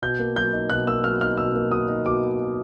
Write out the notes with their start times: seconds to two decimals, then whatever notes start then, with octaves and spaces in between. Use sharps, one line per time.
0.02 B2 G6
0.19 A#3
0.36 F#3 G6
0.53 D#4
0.70 B2 F#6
0.87 A#3 E6
1.04 F#3 F6
1.21 D#4 F6
1.37 B2 E6
1.55 A#3
1.71 F#3 D#6
1.89 D#4
2.05 B2 D6